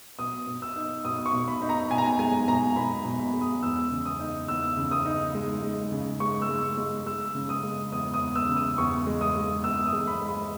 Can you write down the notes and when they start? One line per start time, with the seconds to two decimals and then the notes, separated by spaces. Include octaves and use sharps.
0.19 B2 D#6
0.47 B2
0.62 E6
0.76 D#4
1.05 B2 D#6
1.26 C#6
1.33 B2
1.48 B5
1.62 D#4
1.69 A#5
1.90 B2 G#5
1.98 A#5
2.06 G#5
2.19 G#3 G#5
2.48 B2 A#5
2.76 B2 B5
3.05 B2
3.19 B5
3.33 G#3
3.41 D#6
3.63 E2 E6
3.91 C#3
4.05 D#6
4.20 D#4
4.48 E2 E6
4.77 C#3
4.91 D#6
5.06 D#4
5.35 G#3
5.63 G#3
5.92 C#3
6.20 G#3 C#6
6.42 E6
6.49 G#3
6.78 G#3
7.06 G#3 E6
7.35 C#3
7.49 D#6
7.63 G#3
7.92 E2 D#6
8.14 D#6
8.21 E2
8.35 E6
8.49 C#3
8.56 D#6
8.78 E2 C#6
9.07 G#3
9.21 D#6
9.36 G#3
9.64 E2 E6
9.86 D#6
9.93 G#3
10.07 B5
10.22 G#3
10.29 B5